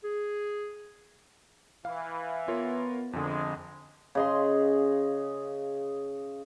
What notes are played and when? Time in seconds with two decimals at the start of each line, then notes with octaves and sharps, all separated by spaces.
0.04 G#4
1.85 E3 F5
2.48 B3 F4 A#4 C#5
3.13 G#1 F2 D3 G#3
4.15 C#3 D#5 C6